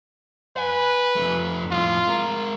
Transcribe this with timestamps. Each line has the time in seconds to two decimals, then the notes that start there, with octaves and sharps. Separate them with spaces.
0.57 B4 F#5 G#5
1.16 F2 A3
1.71 F2 A2 F4
2.07 G#3 A#4